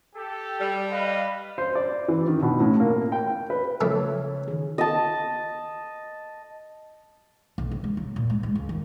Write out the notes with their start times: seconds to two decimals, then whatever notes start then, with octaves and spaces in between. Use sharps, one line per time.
0.15 G4 A4
0.60 G3
0.91 B4 D#5 F5
1.58 C5
1.75 D5
2.08 E3
2.28 D#3
2.42 B2
2.60 A2
2.80 A#3
3.12 G5
3.50 B4
3.81 C#3 E3 F3 A3 C#5
4.48 D#3 G#4
4.78 D#5 A5
7.58 B1
7.71 D3
7.84 G#3
7.97 F#3
8.16 A#2
8.30 G#3
8.43 G#3
8.55 C#2
8.69 D#3